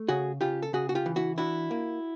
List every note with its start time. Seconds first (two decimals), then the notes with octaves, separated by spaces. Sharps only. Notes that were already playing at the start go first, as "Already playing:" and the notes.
Already playing: A3
0.08 C#3 F#4 G#4
0.41 C#3 F4 G4
0.63 A4
0.73 C#3 F#4 G#4
0.89 F#4
0.95 F4 G4
1.06 E3
1.16 E4 F#4
1.38 D4 E4 F#4
1.71 A#3